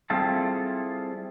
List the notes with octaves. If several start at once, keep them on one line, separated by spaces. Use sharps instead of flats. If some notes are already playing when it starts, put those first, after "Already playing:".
G3 C4 E4 F4 G#4 A4